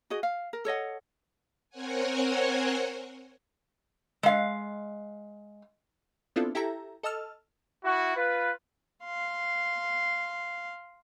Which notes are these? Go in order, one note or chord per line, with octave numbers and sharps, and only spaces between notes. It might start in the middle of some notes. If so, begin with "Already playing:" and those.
F#4 G#4 D#5
F5
A#4
A4 C#5 D#5 F#5
C4 A#4 C5 C#5 F#5 G#5
G#3 F5
B3 C4 D4 E4 F4 A4
E4 G4 A4 E5 A#5
A4 D#5 A5 E6 F6
E4 F#4
F4 B4
F5 C6